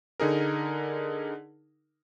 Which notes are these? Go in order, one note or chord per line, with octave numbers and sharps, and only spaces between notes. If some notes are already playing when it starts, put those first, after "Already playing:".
D3 D#4 G#4 A#4